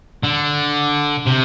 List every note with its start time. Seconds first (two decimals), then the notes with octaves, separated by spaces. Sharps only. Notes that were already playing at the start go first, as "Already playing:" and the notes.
0.24 D3
1.27 C3